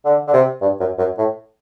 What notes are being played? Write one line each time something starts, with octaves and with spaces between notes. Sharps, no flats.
D3
D3
C3
G2
F#2
F#2
A2